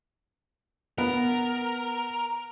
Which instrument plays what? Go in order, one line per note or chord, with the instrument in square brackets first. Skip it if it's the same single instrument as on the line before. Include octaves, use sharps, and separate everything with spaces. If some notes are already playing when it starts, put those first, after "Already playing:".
[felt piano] B3 [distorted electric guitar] A#4